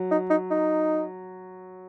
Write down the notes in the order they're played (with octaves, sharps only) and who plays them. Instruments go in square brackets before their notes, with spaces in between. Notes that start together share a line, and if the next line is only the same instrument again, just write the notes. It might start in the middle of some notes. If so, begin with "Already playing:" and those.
Already playing: [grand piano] F#3
[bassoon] D#4
D#4
D#4